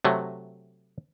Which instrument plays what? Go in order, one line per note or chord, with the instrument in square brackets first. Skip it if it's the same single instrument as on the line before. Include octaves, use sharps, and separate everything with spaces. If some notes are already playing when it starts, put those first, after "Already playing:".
[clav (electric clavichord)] C3 F#3 A3